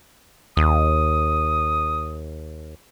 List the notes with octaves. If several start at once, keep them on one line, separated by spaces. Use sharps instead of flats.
D#2 D#6